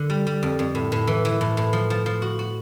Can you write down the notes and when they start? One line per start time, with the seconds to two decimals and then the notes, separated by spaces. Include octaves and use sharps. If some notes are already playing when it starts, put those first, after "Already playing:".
Already playing: D3
0.10 G3
0.27 G3
0.43 F2
0.59 F2
0.75 A2
0.92 A2
1.07 E3
1.25 E3
1.41 A2
1.57 A2
1.73 F3
1.90 F3
2.06 F3
2.22 F#4
2.39 F#4